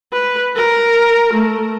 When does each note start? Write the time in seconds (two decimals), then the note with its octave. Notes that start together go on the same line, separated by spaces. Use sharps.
0.13 B4
0.56 A#4
1.33 A3